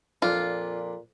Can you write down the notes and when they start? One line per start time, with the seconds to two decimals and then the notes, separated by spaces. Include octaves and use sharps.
0.22 F2 A#2 D4 F4